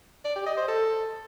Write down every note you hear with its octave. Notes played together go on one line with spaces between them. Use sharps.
D5
G4
D#5
C5
A4